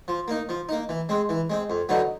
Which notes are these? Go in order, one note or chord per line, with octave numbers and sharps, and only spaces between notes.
F3
A#3 D#4
F3
A#3 D#4
E3
G#3 C4
E3
G#3 C4
F2
D3 F#3 B3 D#4